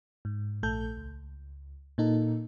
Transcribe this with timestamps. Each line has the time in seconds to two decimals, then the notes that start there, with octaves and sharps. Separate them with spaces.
0.25 G#2
0.63 A#1 A3 A4 G6
0.97 C#2
1.98 A#2 A#3 D#4 A4